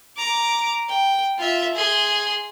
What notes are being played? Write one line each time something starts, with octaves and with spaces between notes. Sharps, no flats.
A#5 D6
G5
F4 E5
G#4 C6